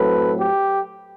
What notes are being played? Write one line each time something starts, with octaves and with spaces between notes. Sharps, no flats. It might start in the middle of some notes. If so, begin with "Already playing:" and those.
Already playing: A2 F#3 A3 C4 A4 B4
G4